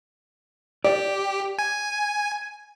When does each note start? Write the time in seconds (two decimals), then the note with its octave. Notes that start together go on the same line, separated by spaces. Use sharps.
0.85 G4 D5
1.59 G#5